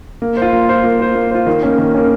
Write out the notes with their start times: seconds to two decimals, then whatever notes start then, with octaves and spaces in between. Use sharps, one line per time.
0.22 A#3
0.37 C5
0.42 F4
0.53 A#3
0.69 F4 C5
0.84 A#3
1.00 F4 C5
1.15 A#3
1.31 F4 C5
1.46 D#3
1.63 A#3 C#4
1.78 D#3
1.95 A#3 C#4